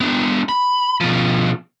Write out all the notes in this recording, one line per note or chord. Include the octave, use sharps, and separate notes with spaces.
B3 D4
B5
B2 F3